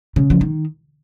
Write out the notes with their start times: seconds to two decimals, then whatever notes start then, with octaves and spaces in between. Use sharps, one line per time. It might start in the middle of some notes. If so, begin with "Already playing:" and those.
0.16 C#3
0.30 F3
0.41 D#3